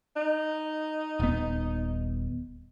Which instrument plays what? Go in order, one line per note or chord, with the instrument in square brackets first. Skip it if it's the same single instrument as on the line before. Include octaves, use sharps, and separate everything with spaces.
[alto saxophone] D#4
[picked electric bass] D#1 B3